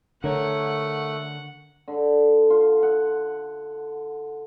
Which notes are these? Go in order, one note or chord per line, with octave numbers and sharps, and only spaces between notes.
D3 A3 A#4 C#5 F#5
D3
F4
F#5